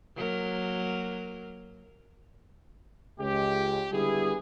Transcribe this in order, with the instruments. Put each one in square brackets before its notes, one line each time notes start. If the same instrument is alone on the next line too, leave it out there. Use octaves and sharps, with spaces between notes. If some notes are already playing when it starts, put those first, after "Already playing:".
[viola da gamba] F#3 A#3 A#4
[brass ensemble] C#2 G#3 G4
D3 G3 B3 E4 G#4